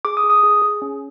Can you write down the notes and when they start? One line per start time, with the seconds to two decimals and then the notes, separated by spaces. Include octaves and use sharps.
0.05 G#4 D6
0.17 D#6
0.24 G#4
0.30 D#6
0.43 G#4
0.62 G#4
0.82 C#4